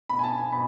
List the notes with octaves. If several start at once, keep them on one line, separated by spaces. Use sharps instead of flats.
B2 B5
G#5
A5
G#5
B2 B5